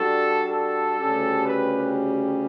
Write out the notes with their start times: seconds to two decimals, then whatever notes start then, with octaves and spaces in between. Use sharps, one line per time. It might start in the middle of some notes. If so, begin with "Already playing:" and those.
Already playing: G3 D4 F#4 A4
0.50 A4
0.98 D2 C#3 G3 C#4 G4
1.46 B4